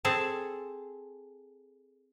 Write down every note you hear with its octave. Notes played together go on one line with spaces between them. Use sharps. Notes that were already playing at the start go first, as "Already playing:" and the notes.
C4 G#4 A4 A5